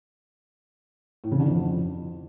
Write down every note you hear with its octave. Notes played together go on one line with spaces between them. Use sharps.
A2
C#3
D3
F2